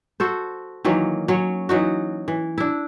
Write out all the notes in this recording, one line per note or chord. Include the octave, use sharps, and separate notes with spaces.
F#4 A4 C5
D#3 E3 F#3 A#3
F#3 C#4 C#5
E3 F#3 D#4 F#4
E3
D4 E4